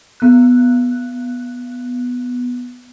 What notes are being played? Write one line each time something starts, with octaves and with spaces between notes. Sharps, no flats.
B3 F#6